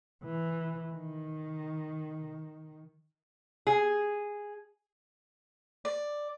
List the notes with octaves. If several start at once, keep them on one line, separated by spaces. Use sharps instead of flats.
E3
D#3
G#4
D5